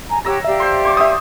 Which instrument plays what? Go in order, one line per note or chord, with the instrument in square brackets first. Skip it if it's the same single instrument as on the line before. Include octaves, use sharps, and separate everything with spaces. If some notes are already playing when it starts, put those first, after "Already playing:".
[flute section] G#5 A#5
[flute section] G4 C#5 F#5 [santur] A#5 E6
[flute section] G4 D5 F5 [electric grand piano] E5
[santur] C5 C6
C5 D6
[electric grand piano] E5 D#6